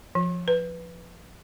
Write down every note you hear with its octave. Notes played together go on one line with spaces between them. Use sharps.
F3
B4